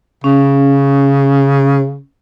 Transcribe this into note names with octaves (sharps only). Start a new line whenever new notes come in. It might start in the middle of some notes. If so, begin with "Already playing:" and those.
C#3 C#4